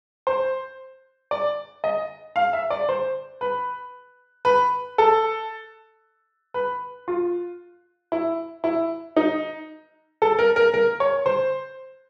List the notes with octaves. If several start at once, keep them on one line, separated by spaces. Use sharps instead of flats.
C5
D5
D#5
F5
E5
D5
C5
B4
B4
A4
B4
F4
E4
E4
D#4
A4
A#4
A#4
A#4
C#5
C5